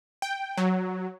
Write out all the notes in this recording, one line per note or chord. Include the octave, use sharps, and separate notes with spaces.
G5
F#3